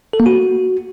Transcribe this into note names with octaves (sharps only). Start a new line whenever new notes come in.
A4
A#3
F#4